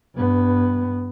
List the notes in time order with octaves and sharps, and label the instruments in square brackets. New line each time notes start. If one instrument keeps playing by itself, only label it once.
[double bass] G2 B3